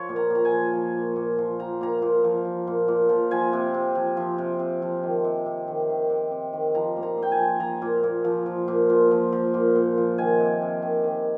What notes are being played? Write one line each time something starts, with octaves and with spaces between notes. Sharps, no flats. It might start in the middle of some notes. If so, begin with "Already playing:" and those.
Already playing: F3 C#5
A#2
A#5
A#2 A#5
G#5
F3
F3
A#2
A#2
F3
F3 A#5
A#2 A#5
A#2
F3
F3
A#2
A#2
F3
F3 G#5
C3
C3
F3
F3
C3
C3
F3
D#3
C3
C3
D#3
D#3
C3
C3
D#3
F3 A#5
A#2
A#5
A#2
G5
G#5
F3
F3 A#5
A#2
A#2
F3
F3
A#2
A#2
F3
F3
A#2
A#2
F3
D#3 G#5
C3
C3
D#3
D#3